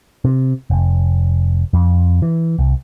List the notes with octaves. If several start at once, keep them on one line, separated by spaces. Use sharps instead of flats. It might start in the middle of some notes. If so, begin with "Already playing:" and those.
C3
F1
F2
E3
C2